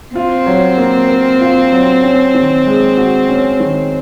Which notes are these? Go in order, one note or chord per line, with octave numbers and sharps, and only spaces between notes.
C4 F4
F#3
A#3
A#4
F4
F#3
C#4
D#3
G#3
F#4
C#4
D#3